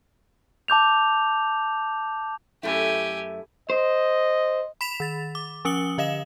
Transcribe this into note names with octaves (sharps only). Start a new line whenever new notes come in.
A5 D6 G6 F7
F#2 A3 E4 G4 G#5
C5 D#5
B5 B6 E7 F7
D#3 A6
D6
F3 C#4 D#6 C#7 F#7 G7
D3 D#5 F5 E7